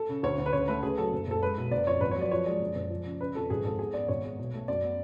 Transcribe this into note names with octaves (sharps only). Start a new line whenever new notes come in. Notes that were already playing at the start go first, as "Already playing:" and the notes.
Already playing: A4
C#3
D2 C#5
D2
B4
C#3 C#5
A3 B4
C#3 G#4
F#3 A4
F#1
F#1 A4
G#3 B4
B1
F#1 D5
F2 C#5
G#1 B4
C#5
F#3 D5
F3 C#5
G#3 D5
F#1
F#1
F3
C#3
C#3 B4
F2 A4
G#1 G#4
G#2 A4
B3 G#4
B3 D5
G#1 C#5
G#3
B1
A3
F#2 D5
B3